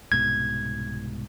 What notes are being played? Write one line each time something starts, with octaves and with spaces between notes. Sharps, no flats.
C2 G#2 B2 G#6